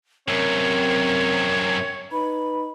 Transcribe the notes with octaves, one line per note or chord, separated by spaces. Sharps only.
F#2 C3 C4 A#4 C#5
D#4 B4 B5